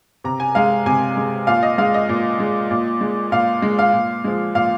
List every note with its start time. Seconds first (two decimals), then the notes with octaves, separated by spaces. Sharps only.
0.24 C3 A#5
0.40 G#5
0.55 G#3 F5
0.86 C3 G#5
1.17 G#3
1.47 A#2 F5
1.63 D#5
1.78 G#3 F5
1.94 D#5
2.09 A#2
2.40 G#3
2.71 A#2
3.01 G#3
3.32 A#2 F5
3.62 G#3
3.79 F5
3.93 A#2
4.24 F3 G#3
4.55 A#2 F5